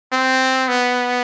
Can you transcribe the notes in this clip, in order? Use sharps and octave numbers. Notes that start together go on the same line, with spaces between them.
C4
B3